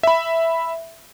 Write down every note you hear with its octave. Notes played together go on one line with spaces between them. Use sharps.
E5 B5